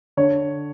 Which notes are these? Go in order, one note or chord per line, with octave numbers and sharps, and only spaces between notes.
D3 C#5